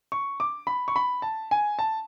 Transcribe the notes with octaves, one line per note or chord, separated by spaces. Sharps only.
C#6
D6
B5
C#6
B5
A5
G#5
A5